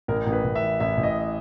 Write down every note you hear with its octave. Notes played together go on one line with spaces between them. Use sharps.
A1 A#4
A1
B4
A1
E5
E3
A1 E5
A1
D#5